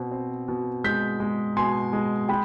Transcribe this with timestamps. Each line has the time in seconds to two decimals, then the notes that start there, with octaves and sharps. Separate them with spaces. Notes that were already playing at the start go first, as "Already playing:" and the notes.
Already playing: B2 C4
0.12 C4
0.48 B2
0.84 G#3 G6 B6
1.20 G#3
1.57 B2 G#5 C6
1.93 G#3
2.29 G#3 G5 B5